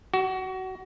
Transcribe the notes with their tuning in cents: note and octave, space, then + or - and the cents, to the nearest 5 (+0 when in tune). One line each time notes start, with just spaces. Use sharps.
F#4 +25